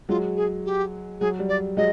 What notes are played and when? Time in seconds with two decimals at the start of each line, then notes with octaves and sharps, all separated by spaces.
0.09 F#3 G#3 F4
0.36 G#4
0.65 G4
1.20 F#3 G#4
1.39 G3
1.49 D5
1.77 F#3 G#3 D#5